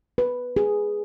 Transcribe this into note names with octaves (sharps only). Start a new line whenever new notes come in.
B4
G#4